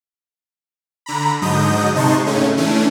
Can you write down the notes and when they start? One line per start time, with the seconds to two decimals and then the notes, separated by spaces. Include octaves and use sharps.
1.06 D3 A#5 B5
1.42 G#2 D3 F#3 D#5 D#6 G6
1.94 C3 G#3 D#4 A5 C6 C#6
2.26 A2 C#3 A3 C#4
2.57 E3 A3 C#4 D4